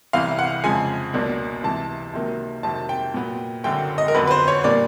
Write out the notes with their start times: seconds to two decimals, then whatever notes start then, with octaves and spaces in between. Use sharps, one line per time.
0.13 C2 C3 E3 G3 B3 F5
0.39 F#5
0.64 F2 C#3 F3 G#3 G#5
1.14 C#2 B2 F#3 A#3 D4
1.64 C#2 C3 E3 A5
2.14 C#2 C3 D#3 F#3 A#3
2.63 F2 C3 D#3 F#3 A5
2.89 G5
3.14 A#2 F#3 B3
3.64 F#1 F#2 D3 F#3 G5
3.98 D#5
4.08 A#4
4.14 F2 D3 F#3 B3 B4
4.27 B4
4.31 C5
4.48 C#5
4.64 A#2 G3 A#3 D4 D5